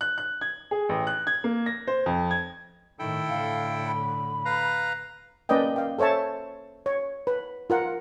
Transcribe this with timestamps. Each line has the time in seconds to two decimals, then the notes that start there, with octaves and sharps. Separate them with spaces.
0.01 F#6
0.18 F#6
0.41 G#6
0.71 G#4
0.89 A1
1.07 F#6
1.27 G#6
1.44 A#3
1.66 A#6
1.87 C5
2.06 F2
2.31 G#6
2.99 A2 D#3 E4 A4 G5
3.29 A2 D3 F5
3.86 B5
4.45 B4 F5 A#5
5.49 A#3 C#4 B4 D5 D#5 G5
5.76 F5 G5
5.99 A4 C5 C#5 E5 A5
6.86 C#5
7.27 B4
7.70 F4 A#4 F#5